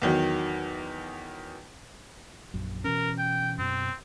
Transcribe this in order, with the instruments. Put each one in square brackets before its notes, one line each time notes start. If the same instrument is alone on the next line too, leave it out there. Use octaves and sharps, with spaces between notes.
[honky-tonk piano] E2 D#3 F#3
[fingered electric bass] A#1 F#2
[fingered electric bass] B2 E3 C#4 [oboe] A#4
[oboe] G5
[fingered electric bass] F#2 B2 [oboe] C4